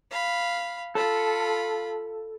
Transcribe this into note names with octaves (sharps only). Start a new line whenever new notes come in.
F5 B5
F4 A4 B5